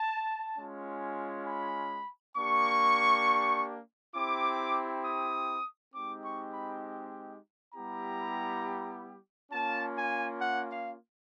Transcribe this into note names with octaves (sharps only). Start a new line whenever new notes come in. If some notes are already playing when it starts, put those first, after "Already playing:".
Already playing: A5
G#3 C#4 F4
B5
A#3 D4 G4 C#6
C4 E4 G4 D6
D#6
G#3 C4 D#4 G4 D6
C#6
B5
G3 B3 E4 G4 A#5
A#3 C#4 F4 A5
G#5
F#5
F5